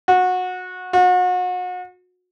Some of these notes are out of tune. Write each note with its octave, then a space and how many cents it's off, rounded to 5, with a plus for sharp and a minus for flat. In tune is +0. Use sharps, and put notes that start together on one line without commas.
F#4 -20
F#4 -35